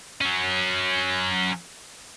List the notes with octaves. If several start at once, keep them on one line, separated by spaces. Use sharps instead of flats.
F#3 C#4